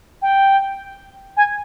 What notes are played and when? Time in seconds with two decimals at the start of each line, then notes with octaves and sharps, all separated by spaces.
0.22 G5
1.37 G#5